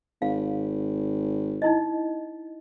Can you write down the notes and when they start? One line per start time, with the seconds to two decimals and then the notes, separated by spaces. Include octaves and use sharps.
0.22 G#1 F5
1.62 D#4 E4 D#5